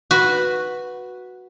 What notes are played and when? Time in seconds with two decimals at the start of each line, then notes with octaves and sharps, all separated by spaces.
0.11 F#4 B4